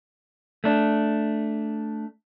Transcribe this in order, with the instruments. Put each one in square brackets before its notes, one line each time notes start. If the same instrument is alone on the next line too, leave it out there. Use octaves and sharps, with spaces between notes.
[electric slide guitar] A3 D4